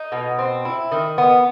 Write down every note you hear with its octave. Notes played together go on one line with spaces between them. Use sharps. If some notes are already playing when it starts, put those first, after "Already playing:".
Already playing: D#4
B2
C4
E4
D#3
B3